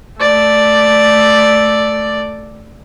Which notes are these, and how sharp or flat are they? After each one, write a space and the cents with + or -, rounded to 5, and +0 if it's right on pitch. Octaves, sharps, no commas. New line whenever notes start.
A3 -5 D5 +0